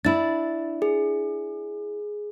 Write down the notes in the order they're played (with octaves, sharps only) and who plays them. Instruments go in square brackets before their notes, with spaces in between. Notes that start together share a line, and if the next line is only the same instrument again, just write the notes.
[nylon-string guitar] D4 E4 [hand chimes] A6
[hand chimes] G#4